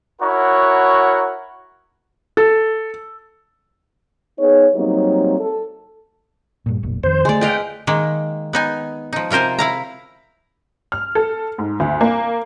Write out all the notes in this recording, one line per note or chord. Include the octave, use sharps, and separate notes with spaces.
E4 F#4 A#4 C#5 F#5
A4
B3 D#4 G#4 C#5
F#3 G3 A#3 C4 D#4 C#5
A4
G2 A#2
F1 B1 A#2
F2 D#3 C5
D3 G#3 A3 D5
B4 D#5 F5 G5
D#3 G#3 A#3
B3 D#4 G#5
F3 D#4
C3 F4 A#4 C5 G#5
E4 F5 A#5
F6
A4
G#2
D2
A#3